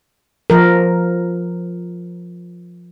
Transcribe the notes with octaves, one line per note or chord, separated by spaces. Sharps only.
F3 A#4